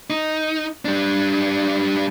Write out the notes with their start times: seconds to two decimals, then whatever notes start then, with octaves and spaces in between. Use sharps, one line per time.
0.10 D#4
0.85 G3 D4